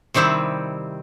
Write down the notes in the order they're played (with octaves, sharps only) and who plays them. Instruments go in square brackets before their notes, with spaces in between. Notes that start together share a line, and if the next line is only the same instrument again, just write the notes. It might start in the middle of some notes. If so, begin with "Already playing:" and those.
[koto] C3 D#3 G3 C4 E4